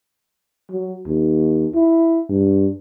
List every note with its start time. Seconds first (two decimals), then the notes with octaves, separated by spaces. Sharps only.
0.71 F#3
1.07 D#2
1.75 E4
2.30 G2